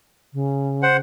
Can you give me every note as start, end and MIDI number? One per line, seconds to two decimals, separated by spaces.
0.33 1.00 49
0.83 0.97 72
0.83 0.97 78